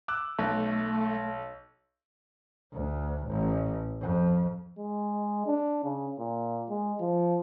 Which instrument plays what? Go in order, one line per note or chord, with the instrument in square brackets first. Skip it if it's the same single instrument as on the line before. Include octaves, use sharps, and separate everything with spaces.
[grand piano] D6 E6 F#6
[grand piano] B1 [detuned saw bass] A3
[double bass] D2
A1
F2
[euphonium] G#3
D4
C#3
A#2
G#3
F3